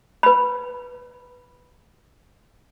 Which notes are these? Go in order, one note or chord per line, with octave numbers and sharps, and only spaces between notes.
B4 B5